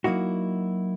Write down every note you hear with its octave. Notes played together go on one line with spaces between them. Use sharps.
F#3 A#3 D#4 E4 F#4